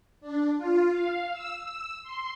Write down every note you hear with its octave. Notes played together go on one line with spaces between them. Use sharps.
D4
F4
F5
E6
E6
C6